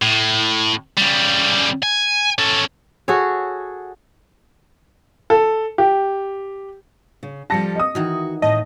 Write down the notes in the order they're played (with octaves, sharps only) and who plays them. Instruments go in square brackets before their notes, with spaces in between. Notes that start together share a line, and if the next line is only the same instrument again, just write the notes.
[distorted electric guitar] A2
C#3 G3
G#5
C#4 A4
[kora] F#4 G#4 A4 C#5
[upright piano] A4
G4
[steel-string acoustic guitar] C#3
[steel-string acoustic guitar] F3 G3 A4 [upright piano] A5 A#6 C#7
[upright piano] D#5 D#6
[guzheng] D#3 E3 D#4 [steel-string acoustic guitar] F#4
[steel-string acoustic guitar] A2 [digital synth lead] D#5 [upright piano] A5